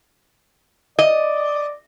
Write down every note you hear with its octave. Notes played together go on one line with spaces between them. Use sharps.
D5 D#5